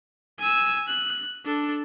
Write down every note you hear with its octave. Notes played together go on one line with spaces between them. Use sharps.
G#5 E6
F#6
D4 A4